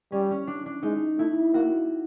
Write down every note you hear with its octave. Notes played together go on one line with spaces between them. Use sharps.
G3 C#4
C#4
D4
D4
G#3 D#4
A3 E4
A#3 F#4